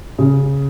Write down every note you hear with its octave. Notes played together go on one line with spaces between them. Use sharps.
C#3